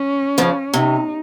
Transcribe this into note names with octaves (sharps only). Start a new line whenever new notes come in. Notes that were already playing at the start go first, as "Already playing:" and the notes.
Already playing: C#4
C#3 F3
C3 D#4